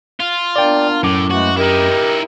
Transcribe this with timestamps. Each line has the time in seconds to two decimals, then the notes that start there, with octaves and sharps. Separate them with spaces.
0.20 F4
0.56 A#3 B3 D4 D5 G5
1.03 F#2 A2 D6
1.30 E3 G#3 A3 F#4
1.57 D#4 E4 G4 A#4